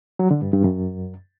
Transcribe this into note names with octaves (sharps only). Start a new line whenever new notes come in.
F#3
D3
G2
G2
F#2